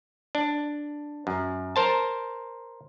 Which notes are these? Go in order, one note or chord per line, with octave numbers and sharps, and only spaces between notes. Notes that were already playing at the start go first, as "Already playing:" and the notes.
D4
F#2
A#4 C5 A5